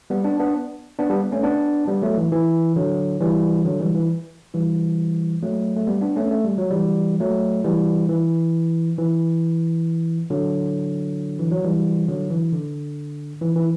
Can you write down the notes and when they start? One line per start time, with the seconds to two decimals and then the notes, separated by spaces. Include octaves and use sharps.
0.10 G3 B3
0.24 B3 D4
0.39 B3 D4
0.99 B3 D4
1.10 G3 B3
1.32 A3 C#4
1.43 B3 D4
1.88 G3 B3
2.02 F#3 A3
2.17 E3
2.32 E3
2.76 D3 F#3
3.21 E3 G3
3.65 D3 F#3
3.80 E3 G3
3.94 E3
4.54 E3 G3
5.43 F#3 A3
5.76 A3
5.87 G3 B3
6.01 B3 D4
6.16 A3 C#4
6.31 A3
6.45 G3
6.58 F#3
6.71 E3 G3
7.20 F#3 A3
7.65 E3 G3
8.09 E3
8.98 E3
10.30 D3 F#3
11.39 E3
11.51 F#3
11.64 E3 G3
12.08 D3 F#3
12.31 E3
12.52 D3
13.42 E3
13.56 E3